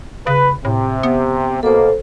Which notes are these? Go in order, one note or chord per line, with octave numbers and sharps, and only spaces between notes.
C#3 B4
A2 C3
B3
B2 A#3 A4 C5